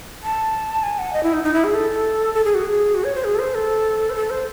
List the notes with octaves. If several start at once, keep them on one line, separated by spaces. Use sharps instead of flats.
A5
G#5
F#5
D#5
E4
D#4
D#4
E4
G#4
A4
A4
G#4
F#4
G#4
F#4
C#5
C5
G#4
A4
C5
A4
C5
A4
C5